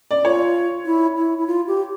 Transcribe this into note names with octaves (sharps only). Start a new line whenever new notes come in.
D5
F4 C#5
E4
E4
E4
F4
G4